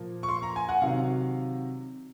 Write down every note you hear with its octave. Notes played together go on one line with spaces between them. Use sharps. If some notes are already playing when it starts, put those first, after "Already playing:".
Already playing: A#2 F3 A#3
C#6
C6
A#5
G#5
F#5
C3 D#3 F#3 F5